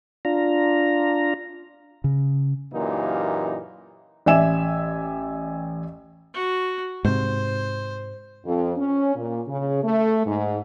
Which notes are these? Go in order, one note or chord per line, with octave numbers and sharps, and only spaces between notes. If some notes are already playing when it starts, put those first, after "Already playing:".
D4 F4 A#5
C#3
F#2 A#2 E3 A#3 D#4 G4
A1 D5 E5 G#5 E7
F#4
G#2 C3 C5
F2
C#4
A#2
C#3
A3
G#2